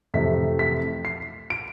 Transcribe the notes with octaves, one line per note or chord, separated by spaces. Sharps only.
F2 C3 E3 A3 B6
B6
C7
D7